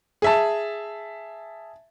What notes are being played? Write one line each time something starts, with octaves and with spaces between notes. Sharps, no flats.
G#4 E5 A5